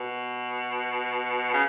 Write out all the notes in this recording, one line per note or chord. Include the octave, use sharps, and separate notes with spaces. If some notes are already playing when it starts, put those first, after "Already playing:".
Already playing: B2
C#3